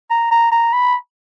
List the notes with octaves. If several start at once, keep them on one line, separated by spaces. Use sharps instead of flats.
A#5
A#5
A#5
B5